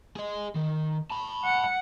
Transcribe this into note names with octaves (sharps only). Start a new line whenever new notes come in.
G#4 D#5
D#3
A5 B5
F#5